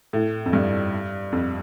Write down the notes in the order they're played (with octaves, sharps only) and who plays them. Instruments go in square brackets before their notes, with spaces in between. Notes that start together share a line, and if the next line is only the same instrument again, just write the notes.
[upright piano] A2
F2
G2
F2